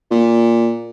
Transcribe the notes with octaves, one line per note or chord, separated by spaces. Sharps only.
A#2